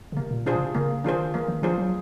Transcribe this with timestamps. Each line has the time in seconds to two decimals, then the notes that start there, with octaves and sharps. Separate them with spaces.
0.12 C#3
0.17 C3 A#3
0.31 A#2
0.46 B2 D4 F4 G#4 C5
0.56 C#3
0.61 C3
0.75 C#3 A#3
1.04 D#3 D4 F4 G#4 C5
1.34 E3 A#3
1.48 D#3
1.62 F3 D4 F4 G#4 C5
1.78 F#3